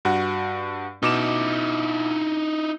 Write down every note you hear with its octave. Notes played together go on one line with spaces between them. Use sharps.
G2 F#4 F#5
B2 D#4 E4 D6 E7